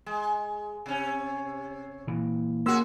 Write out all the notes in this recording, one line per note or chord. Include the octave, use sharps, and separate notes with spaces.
G#3
C3 C#4
A#2 E3
C#3 A#3 F#4 C6 E6